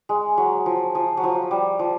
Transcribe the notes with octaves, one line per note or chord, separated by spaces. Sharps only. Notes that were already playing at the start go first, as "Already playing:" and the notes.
G#3
F#3
F3
F3
F#3
F3
G3
F3